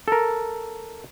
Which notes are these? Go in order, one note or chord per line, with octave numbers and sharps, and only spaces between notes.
A4 A#4